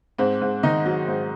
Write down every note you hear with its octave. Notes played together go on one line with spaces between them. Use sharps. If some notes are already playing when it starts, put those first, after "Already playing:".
G#2 C4
G#2
D#3 D#4
F#3
G#2